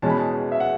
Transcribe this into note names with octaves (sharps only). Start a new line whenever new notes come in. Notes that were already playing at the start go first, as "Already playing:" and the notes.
E2 B2 G#3 C#4 A5
B5
A5
E5
F#5